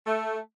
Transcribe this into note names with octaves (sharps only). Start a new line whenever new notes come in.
A3